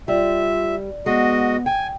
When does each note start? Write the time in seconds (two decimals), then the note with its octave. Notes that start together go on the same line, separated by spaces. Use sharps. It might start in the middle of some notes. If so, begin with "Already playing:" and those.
0.08 G3 F4 E5
1.06 G#3 B3 F#4 D#5
1.66 G5 G#5